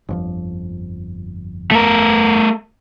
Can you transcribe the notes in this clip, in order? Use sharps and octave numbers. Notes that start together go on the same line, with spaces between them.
G1 F2 F3
A3 A#4